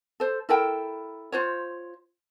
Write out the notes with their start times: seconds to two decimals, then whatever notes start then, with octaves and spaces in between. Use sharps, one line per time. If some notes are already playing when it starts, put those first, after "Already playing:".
0.20 A4 C5
0.49 E4 A4 A#4 G5
1.32 F4 C5 C#5